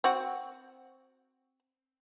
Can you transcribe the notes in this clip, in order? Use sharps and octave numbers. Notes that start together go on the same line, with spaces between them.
C4 F#4